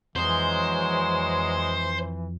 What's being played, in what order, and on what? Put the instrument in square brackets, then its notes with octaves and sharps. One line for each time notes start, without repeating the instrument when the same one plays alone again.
[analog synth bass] F2 [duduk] E3 [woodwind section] F#3 G#3 [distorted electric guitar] C5